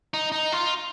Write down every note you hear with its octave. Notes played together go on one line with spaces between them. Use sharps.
D#4
D#4
F4